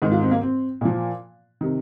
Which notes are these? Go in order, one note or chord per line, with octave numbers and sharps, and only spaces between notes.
G#2 D#3 D#4
F4
C4
A#3
C4
A#2 F3
C3 D#3